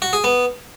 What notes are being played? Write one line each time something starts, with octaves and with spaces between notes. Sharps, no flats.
F#4
G#4
B3